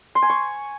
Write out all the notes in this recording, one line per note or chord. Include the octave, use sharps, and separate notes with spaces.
C6
G#5
C#6